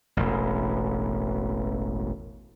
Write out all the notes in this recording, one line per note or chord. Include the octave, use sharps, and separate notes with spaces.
E1 A1